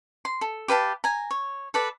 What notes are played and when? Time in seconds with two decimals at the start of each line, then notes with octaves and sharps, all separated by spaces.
0.25 C6
0.41 A4
0.68 G4 B4 F5 A5
1.04 G#5 A#5
1.31 C#5
1.74 A4 B4 D5